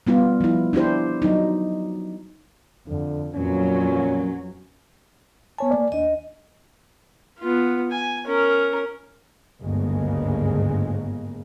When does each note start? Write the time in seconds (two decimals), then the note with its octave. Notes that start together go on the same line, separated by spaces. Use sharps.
0.07 G3 B3 F4
0.41 F3 E4
0.73 D4 E4 G4 C5
1.22 F#3 D#4
2.87 F2 D3
3.35 F2 A#2 E3 F#3 C#4
5.58 B3 C#5 G#5 A5
5.71 A#3 D5
5.92 D#2 D4 D#5
7.39 B3 F4
7.91 G#5
8.26 C#4 A#4
9.62 G1 D2 G#2 C#3 G#3 A#3